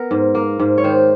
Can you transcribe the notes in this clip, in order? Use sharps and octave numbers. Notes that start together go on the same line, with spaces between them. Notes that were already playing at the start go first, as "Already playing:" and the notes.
Already playing: B3 A#4
G#2
A#3
G#2
C#5
D#3 C5